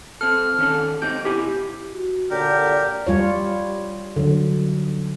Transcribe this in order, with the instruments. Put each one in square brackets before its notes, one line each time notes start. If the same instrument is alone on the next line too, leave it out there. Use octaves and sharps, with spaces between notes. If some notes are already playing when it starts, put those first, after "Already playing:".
[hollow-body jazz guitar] C4 A4 [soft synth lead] F6
[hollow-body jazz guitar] D#3 C#4 A4
[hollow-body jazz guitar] C4 D#4 G4 [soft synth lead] G6
[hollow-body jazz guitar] B2 E4 G#5 [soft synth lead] G4
[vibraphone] F#4
[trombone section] A#2 D3 [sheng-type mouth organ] G4 A#4 [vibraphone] C#5 D5
[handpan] G3 F4 C#5
D3 F#3